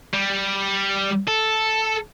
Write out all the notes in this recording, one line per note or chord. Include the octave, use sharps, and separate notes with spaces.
G3
A4